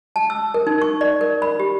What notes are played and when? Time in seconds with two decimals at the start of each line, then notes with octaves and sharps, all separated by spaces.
0.16 A5
0.30 E6
0.54 A#4
0.67 D#4
0.82 C#6
1.01 D5
1.21 A#4
1.42 B5
1.60 G4